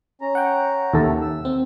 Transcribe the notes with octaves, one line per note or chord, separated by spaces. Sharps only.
C#4 A#5
F#5 G5
D#2 A4 E5
E6
C4